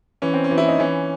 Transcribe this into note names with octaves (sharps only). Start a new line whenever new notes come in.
E3 C#4
C4
C#4
E3
E4
D#4
E3 C#4